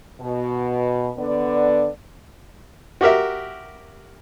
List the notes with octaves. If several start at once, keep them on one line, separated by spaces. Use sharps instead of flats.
B2
D3 B3 D5
F#4 G4 A#4 E5